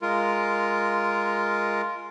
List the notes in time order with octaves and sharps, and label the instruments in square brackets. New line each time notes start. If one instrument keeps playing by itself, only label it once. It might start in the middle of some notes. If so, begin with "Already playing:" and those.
[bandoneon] G#3 F4 A#4